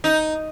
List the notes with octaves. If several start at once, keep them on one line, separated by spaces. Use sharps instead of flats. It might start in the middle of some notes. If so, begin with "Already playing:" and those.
D#4